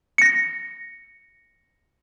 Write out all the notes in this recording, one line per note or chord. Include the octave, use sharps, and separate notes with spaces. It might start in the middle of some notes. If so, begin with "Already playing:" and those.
A#6 C#7